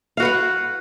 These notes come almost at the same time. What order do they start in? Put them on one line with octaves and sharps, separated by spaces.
F5 F#4 B4 F#5